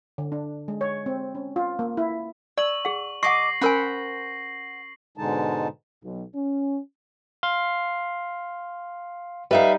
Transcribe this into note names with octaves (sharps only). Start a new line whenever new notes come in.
D3
D4
G#3
C#5
C4
C#4
F4
A#3
E4
D5 C#6 E6 F#7
G#4 F#5
D#5 F#5 C#6 D6 A#6 C7
C#4 A#4 C5 F#5 G#5 B5
G#2 B2 D3 G#3 D#4 A5
B1
C#4
F5 C6
G3 D#4 B4 E5 F5